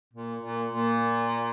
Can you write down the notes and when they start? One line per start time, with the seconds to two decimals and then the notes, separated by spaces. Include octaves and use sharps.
0.13 A#2
0.42 A#2
0.72 A#2